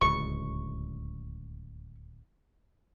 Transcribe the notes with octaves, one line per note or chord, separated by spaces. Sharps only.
D1 C#2 C#6